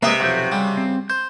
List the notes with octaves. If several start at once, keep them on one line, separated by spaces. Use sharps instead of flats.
C3 G#3 A#3 B4 D#5 E5
B1 F2 F#4 D6 G6
C#3 G3
C4
C5 G6